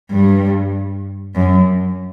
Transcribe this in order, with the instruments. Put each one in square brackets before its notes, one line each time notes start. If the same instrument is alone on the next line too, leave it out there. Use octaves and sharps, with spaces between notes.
[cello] G2
F#2